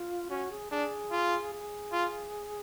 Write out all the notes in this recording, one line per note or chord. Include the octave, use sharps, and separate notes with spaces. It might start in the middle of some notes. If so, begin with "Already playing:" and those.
Already playing: F4
C#4 F#4
G#4
D4 G#4
F4
G#4
F4